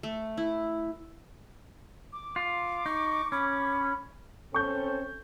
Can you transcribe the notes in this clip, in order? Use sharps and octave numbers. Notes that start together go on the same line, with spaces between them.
A3
E4
D6
F4
D#4 C#6
C#4 B5
C4 C#4 A4 C#6 G6